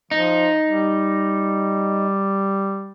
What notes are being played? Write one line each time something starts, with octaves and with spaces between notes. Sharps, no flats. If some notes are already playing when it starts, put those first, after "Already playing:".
F3 D#4
G3